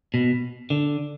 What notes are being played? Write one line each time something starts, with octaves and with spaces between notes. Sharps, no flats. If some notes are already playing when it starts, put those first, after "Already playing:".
B2
D3